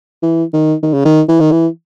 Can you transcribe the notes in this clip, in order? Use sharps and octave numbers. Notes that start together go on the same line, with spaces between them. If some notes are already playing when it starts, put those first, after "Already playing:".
E3
D#3
D#3
C#3
D#3
E3
D#3
E3